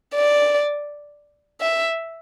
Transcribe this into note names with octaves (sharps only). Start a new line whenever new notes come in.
D5
E5